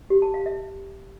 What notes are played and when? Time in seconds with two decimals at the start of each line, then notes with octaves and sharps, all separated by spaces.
0.10 G4
0.22 A5
0.34 F5
0.46 E5